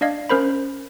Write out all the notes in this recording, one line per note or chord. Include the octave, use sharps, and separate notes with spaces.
D4 D5 D#5 F5 G#6
C#4 A#4 C5 B5